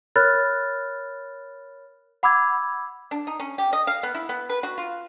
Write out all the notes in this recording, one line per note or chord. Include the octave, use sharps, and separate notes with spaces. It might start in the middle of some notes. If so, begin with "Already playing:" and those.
A#4 C#5 B5 F6 F#6 A6
F#5 B5 D6 E6 G#6
D4
D#4
C#4
G4
D#5
F5
B3
E4
B3
B4
F#4
F4